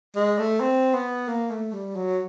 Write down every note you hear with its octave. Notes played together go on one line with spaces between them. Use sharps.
G#3
A3
C4
B3
A#3
A3
G3
F#3